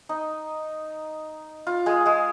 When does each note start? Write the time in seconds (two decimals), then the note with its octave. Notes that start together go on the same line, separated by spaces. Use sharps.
0.09 D#4
1.67 F4
1.86 G#3 G#4
2.06 G#3 G#4